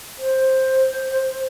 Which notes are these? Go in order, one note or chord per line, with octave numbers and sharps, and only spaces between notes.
C5